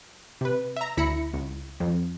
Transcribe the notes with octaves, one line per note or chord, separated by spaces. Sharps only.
C3 B4
E5 A#5
D2 E4 B5 A#6 C#7
C#2
F2